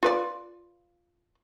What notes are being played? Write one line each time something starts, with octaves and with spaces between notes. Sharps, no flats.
F4 B4 D5